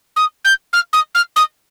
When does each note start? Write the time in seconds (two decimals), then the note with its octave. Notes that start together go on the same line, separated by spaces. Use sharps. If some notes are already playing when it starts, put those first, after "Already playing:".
0.16 D#6
0.44 G6
0.73 F6
0.93 D#6
1.14 F6
1.36 D#6